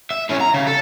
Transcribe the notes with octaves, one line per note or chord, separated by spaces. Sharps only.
E5
A2 C#4
A#5
C#3
A4